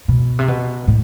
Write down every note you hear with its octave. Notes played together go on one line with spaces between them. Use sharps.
B2
C3
B2
A2